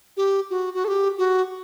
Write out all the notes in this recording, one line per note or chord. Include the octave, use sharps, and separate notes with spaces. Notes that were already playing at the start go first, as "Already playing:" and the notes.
G4
F#4
F#4
A4
G4
F#4